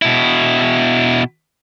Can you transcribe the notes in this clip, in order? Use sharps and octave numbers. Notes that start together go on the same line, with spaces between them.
B2 E4